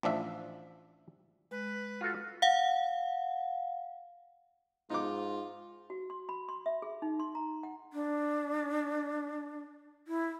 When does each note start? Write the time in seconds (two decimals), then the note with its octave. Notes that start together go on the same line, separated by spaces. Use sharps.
0.03 A1 F3 D4 E5
1.51 G#3 B4
2.01 F4 F#4 A4
2.42 F5 F#5
4.90 G#2 D#4 F4 D6
5.90 F#4
6.10 C6
6.29 B5
6.49 C6
6.66 E5
6.82 G#4
7.02 D#4
7.20 C6
7.35 A#5
7.63 F#5
7.93 D4
10.08 E4